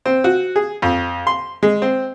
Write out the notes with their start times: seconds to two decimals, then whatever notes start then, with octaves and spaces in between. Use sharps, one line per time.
0.05 C4
0.24 F#4
0.56 G#4
0.82 F2
1.27 C6
1.63 G#3
1.82 C4